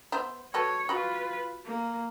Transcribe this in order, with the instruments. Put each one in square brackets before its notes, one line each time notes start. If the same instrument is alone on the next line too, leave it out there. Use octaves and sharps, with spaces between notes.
[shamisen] B3 C5 E5
[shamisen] F#4 A4 B4 [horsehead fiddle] C#5
[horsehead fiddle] F4 B4 [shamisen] F#4 B5
[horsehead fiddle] A#3